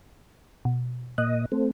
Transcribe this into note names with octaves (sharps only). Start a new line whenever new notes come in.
B2
A#2 D#5 F#6
A3 C4